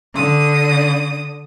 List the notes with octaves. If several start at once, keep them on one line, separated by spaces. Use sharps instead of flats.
D3 D#6